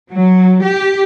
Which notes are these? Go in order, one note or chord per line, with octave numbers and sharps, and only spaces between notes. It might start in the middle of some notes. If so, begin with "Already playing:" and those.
F#3
G4